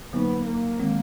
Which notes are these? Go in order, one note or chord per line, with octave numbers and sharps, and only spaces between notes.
D3 F#3 A#3 B3 D#4
A#3
D#3 G#3 C4